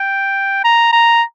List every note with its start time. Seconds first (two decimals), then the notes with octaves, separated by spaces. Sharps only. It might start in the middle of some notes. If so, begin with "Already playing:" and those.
Already playing: G5
0.64 A#5
0.93 A#5